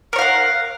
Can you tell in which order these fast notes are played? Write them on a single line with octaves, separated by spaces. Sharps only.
A#4 C#5 F5 F#5